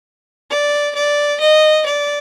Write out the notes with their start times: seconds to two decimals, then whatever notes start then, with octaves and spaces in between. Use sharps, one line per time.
0.51 D5
0.95 D5
1.40 D#5
1.86 D5